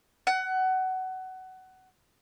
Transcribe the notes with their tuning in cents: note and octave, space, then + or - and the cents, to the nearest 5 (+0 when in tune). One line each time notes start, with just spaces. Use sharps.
F#5 +20